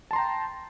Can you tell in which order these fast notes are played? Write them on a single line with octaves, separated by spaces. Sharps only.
A5 C6 A#5 G5